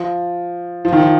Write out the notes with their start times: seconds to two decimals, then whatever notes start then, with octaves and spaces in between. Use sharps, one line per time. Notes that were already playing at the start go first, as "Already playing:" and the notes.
Already playing: F3
0.85 F3
0.93 D#3
1.00 F3